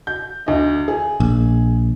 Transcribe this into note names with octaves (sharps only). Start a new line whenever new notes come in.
G6
D2 D#5
G#4
A#1